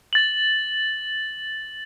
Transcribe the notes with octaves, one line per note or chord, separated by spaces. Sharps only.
A6 F#7